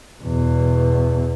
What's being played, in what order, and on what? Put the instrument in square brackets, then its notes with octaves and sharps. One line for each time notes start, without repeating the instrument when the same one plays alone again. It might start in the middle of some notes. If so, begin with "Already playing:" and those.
[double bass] E2 B2